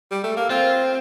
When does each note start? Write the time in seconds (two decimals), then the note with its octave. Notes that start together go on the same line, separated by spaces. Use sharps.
0.11 G3
0.24 A3
0.37 A#3
0.50 C4 F4